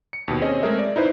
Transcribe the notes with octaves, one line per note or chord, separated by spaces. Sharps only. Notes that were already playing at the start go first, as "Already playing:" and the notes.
C#7
D#2 B2
C4 C#4 G#4 D#5
G#3 A3 C4 G#4 A#4 E5
D5
D#4 E4 B4 C5